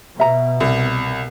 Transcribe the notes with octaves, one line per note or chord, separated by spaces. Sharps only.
B2 E5 A#5
C2